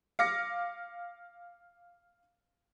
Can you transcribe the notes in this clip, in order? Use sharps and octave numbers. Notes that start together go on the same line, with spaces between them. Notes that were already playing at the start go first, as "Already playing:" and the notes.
F5 D6 A#6 C#7